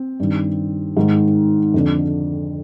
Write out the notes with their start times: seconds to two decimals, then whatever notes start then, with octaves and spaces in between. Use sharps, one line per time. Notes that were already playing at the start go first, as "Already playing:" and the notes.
Already playing: C4
0.20 G2 D#3
0.97 G#2 D#3
1.74 F2 D3